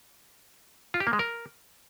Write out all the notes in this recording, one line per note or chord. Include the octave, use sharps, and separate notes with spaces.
F4
G4
A#3
G#3
A#4